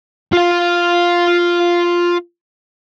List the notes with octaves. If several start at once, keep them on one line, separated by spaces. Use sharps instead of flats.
F4 F5